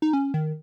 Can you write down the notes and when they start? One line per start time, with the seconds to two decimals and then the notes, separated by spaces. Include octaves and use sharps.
0.02 D#4
0.13 C#4
0.34 D#3